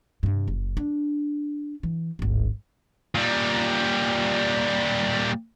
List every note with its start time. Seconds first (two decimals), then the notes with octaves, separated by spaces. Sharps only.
0.23 G2 C3
0.48 F#1
0.77 D4
1.83 E3
2.19 D1 G#1
3.15 A#2 G3